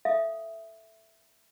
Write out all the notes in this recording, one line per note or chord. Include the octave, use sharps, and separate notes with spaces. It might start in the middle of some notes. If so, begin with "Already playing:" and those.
A4 E5 F5 D#6